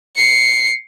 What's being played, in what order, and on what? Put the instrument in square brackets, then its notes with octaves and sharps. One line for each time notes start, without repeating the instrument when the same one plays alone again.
[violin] C7 C#7